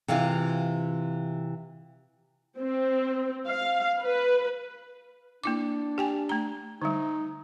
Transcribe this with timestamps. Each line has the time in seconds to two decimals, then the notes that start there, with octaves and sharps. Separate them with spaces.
0.08 C3 E3 F4 F5
2.58 C4
3.46 F5
4.01 B4
5.44 A#3 D4 E4 D6
5.98 G4 G5 G#5
6.29 A3 A#5
6.82 D3 G3 D#4